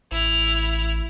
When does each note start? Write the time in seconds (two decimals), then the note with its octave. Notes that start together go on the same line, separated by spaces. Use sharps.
0.11 A1 E4 F7